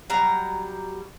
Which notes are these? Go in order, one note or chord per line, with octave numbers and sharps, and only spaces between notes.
F#3 G3 A#5